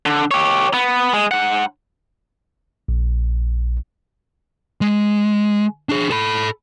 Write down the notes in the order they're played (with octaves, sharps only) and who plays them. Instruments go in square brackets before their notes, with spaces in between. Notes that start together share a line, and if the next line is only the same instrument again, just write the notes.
[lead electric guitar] D3
G4 C#5
B3
G#3
G#2 F#5
[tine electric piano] A#1
[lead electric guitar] G#3
D4 G#4
A4 B5